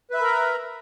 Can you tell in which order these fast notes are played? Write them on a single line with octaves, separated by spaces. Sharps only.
B4 E5 B5 A#4 A#5